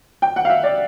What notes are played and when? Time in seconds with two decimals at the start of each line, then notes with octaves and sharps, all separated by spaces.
0.22 G5
0.36 F#5
0.45 F5
0.50 E5
0.63 D5